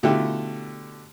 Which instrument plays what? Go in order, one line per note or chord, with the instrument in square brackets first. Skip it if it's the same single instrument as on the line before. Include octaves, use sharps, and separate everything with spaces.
[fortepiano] B2 D3 A3 E4 F4 G4